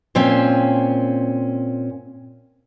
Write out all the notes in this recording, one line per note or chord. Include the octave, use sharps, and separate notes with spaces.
A#2 C4 C#4